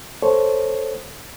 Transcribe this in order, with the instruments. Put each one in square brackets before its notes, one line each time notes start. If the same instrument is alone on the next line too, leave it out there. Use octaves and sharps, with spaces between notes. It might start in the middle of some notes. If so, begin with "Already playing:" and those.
[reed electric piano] A4 C5 C#5